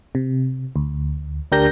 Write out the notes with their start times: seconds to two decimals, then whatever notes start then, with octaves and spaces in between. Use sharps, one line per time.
0.15 C3
0.76 D2
1.52 D2 D4 G4 A#4 G6 A#6